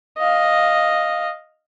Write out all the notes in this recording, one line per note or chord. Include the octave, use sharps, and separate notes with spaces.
D#5 F5